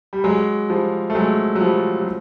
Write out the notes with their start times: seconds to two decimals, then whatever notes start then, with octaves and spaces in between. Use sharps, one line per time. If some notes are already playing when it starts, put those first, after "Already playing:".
0.13 G3
0.24 F#3 G#3
0.69 F3 G3
1.10 A3
1.15 F#3 G#3
1.55 F#3
1.60 F3 G3
2.01 F#3